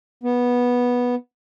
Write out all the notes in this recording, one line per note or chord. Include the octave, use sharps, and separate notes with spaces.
B3